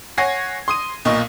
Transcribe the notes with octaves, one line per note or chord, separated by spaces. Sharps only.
C#5 F#5 G#5 G#6 A#6 C7
C6 D#6 D#7
B1 A#2 D#5 C#6